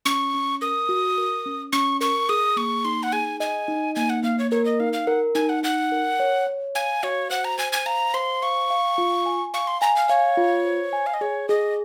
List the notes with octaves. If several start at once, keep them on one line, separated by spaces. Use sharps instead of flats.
C#4 C#6
C#4
A#4 D#6
F#4
A#4
C#4
C#4 C#6
A#4 C#6
G#4 D#6
A#3 C#6
D#4 C6
F#5
G#4 G#5
D#5 G#5
D#4
A#3 G#5
F#5
A#3 F5
C#5
A#4 C#5
D#5
D#4 F5
F5
A#4 F#5
D#4 G#5
F#5
D#4 F#5
A#4
C#5
C#5
F5 G#5
F#4 C#5
C5 F#5
A#5
C5 G#5
G#5
F5 A#5
C5 C6
F5 C#6
F5
F4
G#5
F5 C#6
C6
G#5 A#5
F5
C#5 F5
F4
C5
G#5
F5
D#5
G#4 C#5
G#4 D#5